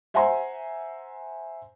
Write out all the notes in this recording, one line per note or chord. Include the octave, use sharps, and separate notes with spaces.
C5 E5 F#5 G#5 A#5 C6